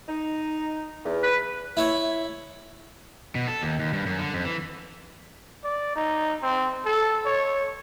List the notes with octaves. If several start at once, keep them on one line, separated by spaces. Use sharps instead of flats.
D#4
E2
B4
E4 C#5
B2
A4
D#2
D#2
G2
F#2
D3
F2
E3
D5
D#4
C4
A4
C#5